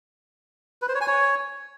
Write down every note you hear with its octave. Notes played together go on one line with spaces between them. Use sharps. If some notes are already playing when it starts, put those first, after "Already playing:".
B4
C5
C#5
G#5
C#5